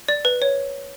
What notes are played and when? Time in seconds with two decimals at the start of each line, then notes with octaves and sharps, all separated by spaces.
0.08 D5
0.25 B4
0.42 C#5